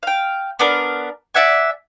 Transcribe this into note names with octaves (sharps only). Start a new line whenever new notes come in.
F5 G5
B3 D4 A#4
D5 E5 F#5 G#5